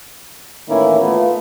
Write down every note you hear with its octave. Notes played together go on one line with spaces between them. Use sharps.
A2 D#3 E3 A#3 C#4 E4
A3 B3 F4